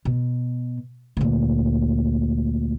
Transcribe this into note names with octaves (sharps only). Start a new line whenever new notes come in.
B2
D2 A#2